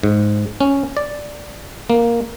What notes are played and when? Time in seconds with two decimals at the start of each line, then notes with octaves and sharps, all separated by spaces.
0.03 G#2
0.60 C#4
0.97 D5
1.90 A#3